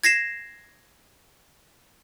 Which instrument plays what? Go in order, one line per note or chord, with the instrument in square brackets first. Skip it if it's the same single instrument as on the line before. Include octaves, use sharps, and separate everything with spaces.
[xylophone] G#6 A#6 C7 E7